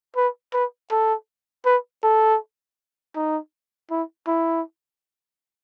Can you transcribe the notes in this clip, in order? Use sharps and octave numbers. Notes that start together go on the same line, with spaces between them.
B4
B4
A4
B4
A4
D#4
E4
E4